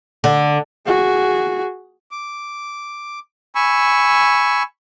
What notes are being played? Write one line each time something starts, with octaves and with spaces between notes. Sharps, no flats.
D3
F#4 G#4
D6
G#5 B5 C#6 E6